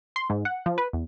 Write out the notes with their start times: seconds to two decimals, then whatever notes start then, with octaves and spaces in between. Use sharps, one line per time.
0.16 C6
0.30 G#2
0.45 F#5
0.66 F3
0.78 B4
0.93 E2